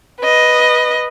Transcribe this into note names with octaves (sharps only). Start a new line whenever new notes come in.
B4 D#5